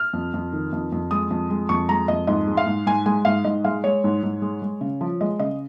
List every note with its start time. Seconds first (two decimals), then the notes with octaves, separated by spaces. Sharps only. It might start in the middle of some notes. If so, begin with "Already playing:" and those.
Already playing: F6
0.13 F2
0.34 F2
0.53 D#3
0.72 F2
0.92 F2
1.11 G#3 D#6
1.30 F2
1.50 G#3
1.69 F2 C#6
1.89 G#3 A#5
2.08 F2 D#5
2.27 G#2 D#5
2.47 G#3
2.57 F5
2.66 G#2
2.86 G#2 G#5
3.06 G#3 G#5
3.25 G#2 F5
3.45 G#2 D#5
3.64 G#3 F5
3.84 G#3 C#5
4.04 G#2
4.23 G#2
4.42 G#3
4.62 G#3
4.81 C#3
5.01 F3
5.21 G#3 D#5
5.39 C#3 D#5